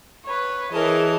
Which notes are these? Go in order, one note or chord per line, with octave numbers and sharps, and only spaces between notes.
B4 C#5
E3 G#4 A#4 C#5 D#5 A5